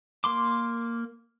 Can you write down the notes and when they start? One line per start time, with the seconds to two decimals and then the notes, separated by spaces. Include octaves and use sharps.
0.24 A#3 C6 D6